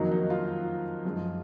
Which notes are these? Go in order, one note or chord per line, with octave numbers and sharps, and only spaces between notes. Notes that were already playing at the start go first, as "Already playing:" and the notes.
Already playing: F2 D#3 F#3 A#3 D#4 F#4
D#4
F4
F#2 F3 G#3